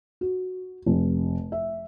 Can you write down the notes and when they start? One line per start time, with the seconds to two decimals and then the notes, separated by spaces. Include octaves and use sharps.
0.21 F#4
0.86 F1
1.52 E5